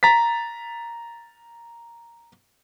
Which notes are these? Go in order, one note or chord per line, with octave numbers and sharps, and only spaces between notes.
A#5 A6 B6